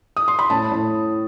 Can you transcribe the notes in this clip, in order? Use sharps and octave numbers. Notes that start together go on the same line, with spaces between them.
D#6
C6
B5
A2 A5
A2